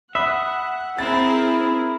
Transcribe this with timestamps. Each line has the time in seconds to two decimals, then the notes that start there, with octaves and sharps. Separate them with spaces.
0.15 E5 F#5 B5 D#6 F#6
0.99 C4 E4 G#4 A#4 A6